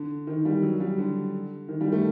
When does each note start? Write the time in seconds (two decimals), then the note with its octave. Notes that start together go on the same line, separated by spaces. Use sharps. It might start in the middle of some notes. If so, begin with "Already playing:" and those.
Already playing: D3
0.27 D#3
0.45 G3
0.63 F#3
0.80 G3
0.98 D3
1.68 D#3
1.81 G3
1.92 A3